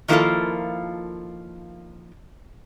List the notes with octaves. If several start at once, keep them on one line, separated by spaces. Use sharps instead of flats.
D#3 F3 A#3 E4 F4 A4